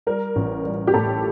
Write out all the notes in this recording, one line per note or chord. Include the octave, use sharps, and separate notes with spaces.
G3 A#4
A1
G3
G4
A2 A4